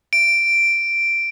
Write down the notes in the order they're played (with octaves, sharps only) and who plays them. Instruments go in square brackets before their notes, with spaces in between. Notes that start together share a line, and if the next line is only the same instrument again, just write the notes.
[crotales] D7